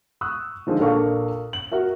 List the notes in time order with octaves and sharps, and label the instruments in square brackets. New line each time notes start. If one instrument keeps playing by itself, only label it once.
[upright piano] C#6 D#6 E6 F#6
D3 D#3 F3 G#3
A#1 D4 A4 A#4 F5 C#6
F#7
F#4 A#4 E5